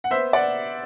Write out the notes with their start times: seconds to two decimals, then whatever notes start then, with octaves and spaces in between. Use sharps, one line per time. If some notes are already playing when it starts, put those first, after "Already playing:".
0.04 F#5
0.11 B3 C5 E5
0.33 D5 F#5